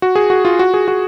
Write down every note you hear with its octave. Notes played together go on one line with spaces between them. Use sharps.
F#4
G#4
F#4
F4
F#4
G#4
F#4